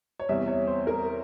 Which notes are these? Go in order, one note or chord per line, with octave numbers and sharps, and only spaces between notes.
C#5
E2 C3 G3 E5
C#5
C5
A#4